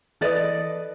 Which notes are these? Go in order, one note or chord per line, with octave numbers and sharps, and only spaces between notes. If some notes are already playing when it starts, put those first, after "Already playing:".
E3 A4 B4 D5 D#5